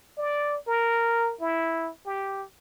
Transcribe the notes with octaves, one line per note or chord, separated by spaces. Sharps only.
D5
A#4
E4
G4